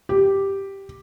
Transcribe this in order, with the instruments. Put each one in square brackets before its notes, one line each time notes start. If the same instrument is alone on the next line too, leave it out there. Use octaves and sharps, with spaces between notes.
[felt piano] G4